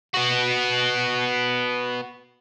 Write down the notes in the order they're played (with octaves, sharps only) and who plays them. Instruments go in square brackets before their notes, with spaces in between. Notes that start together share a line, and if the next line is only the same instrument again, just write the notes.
[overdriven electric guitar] B3 F#4